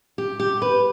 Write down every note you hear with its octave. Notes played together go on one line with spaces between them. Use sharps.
G4
G4
B4